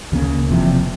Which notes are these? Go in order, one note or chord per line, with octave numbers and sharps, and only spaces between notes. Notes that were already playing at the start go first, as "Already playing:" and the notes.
D2 C#3 F#3 A#3
E1 E2 C3 F3